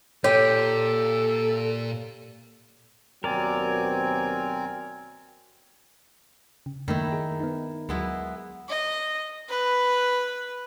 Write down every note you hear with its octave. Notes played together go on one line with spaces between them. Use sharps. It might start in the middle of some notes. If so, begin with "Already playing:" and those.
A#2 G4 A4 C#5
D#2 B2 F#3 C4 A#4 D5 G#5
C#3
F#2 D#3 A3 A#3 E4
G#4
B3 D#4
D2 F#3 G#3 B3 E4
D#5
B4